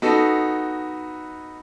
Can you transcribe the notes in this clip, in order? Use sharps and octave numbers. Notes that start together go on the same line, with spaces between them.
B3 D#4 F#4 A4